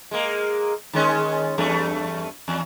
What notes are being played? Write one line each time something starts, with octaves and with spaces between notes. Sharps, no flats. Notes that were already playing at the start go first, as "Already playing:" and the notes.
G#3 A#3
D#3 G#3 C#4
E2 G2 A3
E2